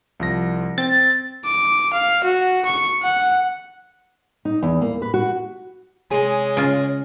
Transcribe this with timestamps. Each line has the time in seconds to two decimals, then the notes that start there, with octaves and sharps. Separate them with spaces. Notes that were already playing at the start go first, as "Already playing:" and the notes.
0.20 C2 F3 A#6
0.78 C4 G5 A6
1.45 D6
1.94 F5
2.24 F#4
2.66 C#6
3.02 F#5
4.45 D#4
4.62 E2
4.81 A#3
5.02 B4
5.14 F#4
6.11 C3 G#3 G#4 C#5 G#5
6.57 C#3 F4